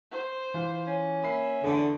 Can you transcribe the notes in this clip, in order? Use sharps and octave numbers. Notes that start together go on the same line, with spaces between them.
C5
E3 F4
C#4
A#3 E5 B5 C7
E2 D3 A3 B3